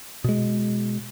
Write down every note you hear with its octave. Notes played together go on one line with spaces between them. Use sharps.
B2 G#3